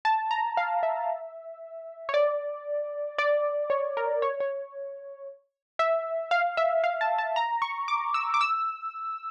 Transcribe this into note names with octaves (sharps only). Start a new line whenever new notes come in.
A5
A#5
F5
E5
C#5
D5
D5
C#5
A#4
C#5
C#5
E5
F5
E5
F5
A5
A5
A#5
C#6
D6
E6
D6
E6